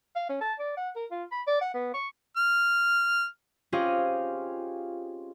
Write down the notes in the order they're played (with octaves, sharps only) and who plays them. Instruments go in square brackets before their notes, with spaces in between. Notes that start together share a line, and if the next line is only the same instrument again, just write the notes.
[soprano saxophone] F5
C#4
A5
D5
F#5
A#4
F4
B5
D5
F#5
B3
C#6
[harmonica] F6
[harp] C4 C#4 F4 G4 G#4 D#5